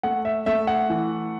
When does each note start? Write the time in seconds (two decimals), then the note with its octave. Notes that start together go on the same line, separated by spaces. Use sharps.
0.03 A3 F#5
0.25 E5
0.46 A3 E5
0.67 F#5
0.90 E3